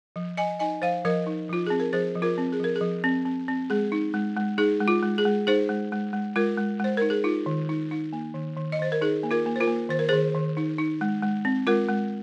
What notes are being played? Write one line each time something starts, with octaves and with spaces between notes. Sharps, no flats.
F3
F3 D#5 G#5
D#4 D#5 G#5
F3 C5 F5
F3 A#4 D#5
D#4
F3 F4
C4 G#4
A#4
F3 G#4 C5
F3
F4 A#4
C4
G#4
F3 A#4
G#4
F3
C4
C4
C4
G#3 G#4
D#4
G#3
G#3
D#4 G#4
G#3
F4
G#3
G#4
G#3
D#4 G#4 C5
G#3
G#3
G#3
G#3 F4 A#4
G#3
G#3 C5
D#4 A#4
G#4
D#4 F4
D#3
D#4
D#4
A#3
D#3
D#3
D#5
D#3 C5
A#4
D#4 G#4
A#3
F4 A#4
A#3
C5
F4 A#4
A#3
D#3 C5
A#4
D#3 G#4 C5
D#3
D#4
D#4
G#3
G#3
C4
G#3 F4 A#4
G#3